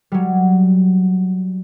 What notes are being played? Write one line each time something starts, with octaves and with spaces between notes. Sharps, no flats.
F#3 G3